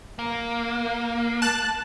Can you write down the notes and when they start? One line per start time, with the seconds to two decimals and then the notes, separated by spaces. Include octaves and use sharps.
0.19 A#3
1.42 A5 F#6